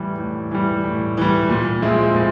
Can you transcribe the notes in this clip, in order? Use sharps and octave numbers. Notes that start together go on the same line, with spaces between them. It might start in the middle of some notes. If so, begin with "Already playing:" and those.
Already playing: A2 E3 G3
A2
E3 G3
A2
E3 G3
A#2
F3 G#3 C4 E4
A#2